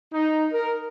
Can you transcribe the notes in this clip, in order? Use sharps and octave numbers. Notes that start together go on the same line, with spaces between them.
D#4
A#4